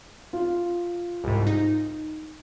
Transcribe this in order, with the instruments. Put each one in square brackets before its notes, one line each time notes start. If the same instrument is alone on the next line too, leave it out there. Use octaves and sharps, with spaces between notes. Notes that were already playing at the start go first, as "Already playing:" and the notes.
[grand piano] F4
[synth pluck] C2 G#2
D#4